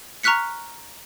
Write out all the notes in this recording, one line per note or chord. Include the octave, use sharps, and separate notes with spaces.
A#5 C#6 F6 F#6 B6 C#7